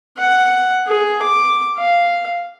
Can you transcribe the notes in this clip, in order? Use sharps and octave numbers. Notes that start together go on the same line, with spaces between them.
F#5
G#4
D6
F5